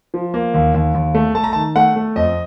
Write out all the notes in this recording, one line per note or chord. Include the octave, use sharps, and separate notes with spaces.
F3
A#3
D#2
D#2
D#2
A3
A3 A5
A#5
A5
D#3
A3 F#5
A3
F2 D#5